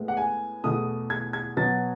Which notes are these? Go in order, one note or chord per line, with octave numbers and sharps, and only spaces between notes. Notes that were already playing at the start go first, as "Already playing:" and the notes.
Already playing: A2 G#3 B3
F#5
G#5
E2 B2 A3 D#6
G#6
G#6
B2 F#3 B3 A6